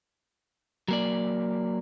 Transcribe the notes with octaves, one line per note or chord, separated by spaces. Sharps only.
F#3 A#3 D5